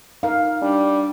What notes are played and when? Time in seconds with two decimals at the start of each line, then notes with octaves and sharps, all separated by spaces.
0.23 D#4 A#4 F5
0.62 G3 D4